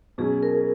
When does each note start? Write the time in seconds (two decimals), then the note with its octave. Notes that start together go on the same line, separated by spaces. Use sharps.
0.18 B2 F#3 C#4 G#4
0.43 A#4